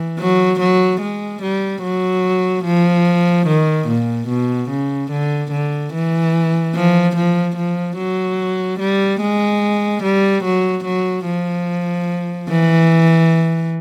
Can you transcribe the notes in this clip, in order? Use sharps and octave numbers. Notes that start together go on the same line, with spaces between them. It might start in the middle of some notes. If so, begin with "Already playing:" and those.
Already playing: E3
F#3
F#3
G#3
G3
F#3
F3
D#3
A#2
B2
C#3
D3
D3
E3
F3
F3
F3
F#3
G3
G#3
G3
F#3
F#3
F3
E3